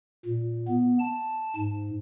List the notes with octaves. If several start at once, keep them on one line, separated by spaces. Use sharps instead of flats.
A#2
B3
A5
G#2